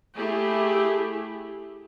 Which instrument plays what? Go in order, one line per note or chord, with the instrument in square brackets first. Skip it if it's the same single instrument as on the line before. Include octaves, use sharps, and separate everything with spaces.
[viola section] A3 E4 G4 G#4